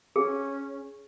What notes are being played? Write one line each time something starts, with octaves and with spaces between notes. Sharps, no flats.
C#4 G#4